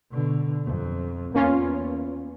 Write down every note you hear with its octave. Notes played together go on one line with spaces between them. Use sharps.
B2 D3
F2
E2 A#3 C#4 F4